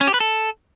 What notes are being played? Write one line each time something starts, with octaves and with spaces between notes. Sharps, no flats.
C#4
G4
B4
A4